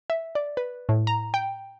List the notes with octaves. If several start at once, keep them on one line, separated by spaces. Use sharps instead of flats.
E5
D5
B4
A2
A#5
G5